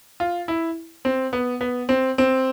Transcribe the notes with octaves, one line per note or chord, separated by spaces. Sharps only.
F4
E4
C4
B3
B3
C4
C4